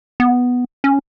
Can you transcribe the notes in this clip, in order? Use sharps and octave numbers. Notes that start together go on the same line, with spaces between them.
B3
C#4